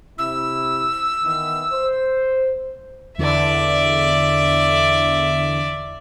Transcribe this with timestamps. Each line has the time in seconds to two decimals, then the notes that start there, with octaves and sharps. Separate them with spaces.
0.18 C3 E4 E6
1.23 D#3 E3 B3
1.71 C5
3.18 E2 D3 D5 E5